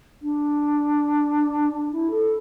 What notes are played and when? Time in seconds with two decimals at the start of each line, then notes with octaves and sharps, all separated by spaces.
0.22 D4
1.73 D4
1.92 E4
2.10 A4